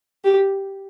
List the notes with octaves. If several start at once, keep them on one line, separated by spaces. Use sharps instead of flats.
G4